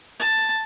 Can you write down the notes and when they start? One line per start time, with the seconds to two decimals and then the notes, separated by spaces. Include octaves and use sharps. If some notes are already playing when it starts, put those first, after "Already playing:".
0.20 A5